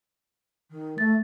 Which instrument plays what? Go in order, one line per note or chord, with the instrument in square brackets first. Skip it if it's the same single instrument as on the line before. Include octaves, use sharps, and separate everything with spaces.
[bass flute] D#3
[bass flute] A3 [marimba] A6